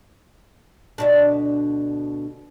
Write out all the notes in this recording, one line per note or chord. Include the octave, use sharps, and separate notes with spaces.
D2 B2 D4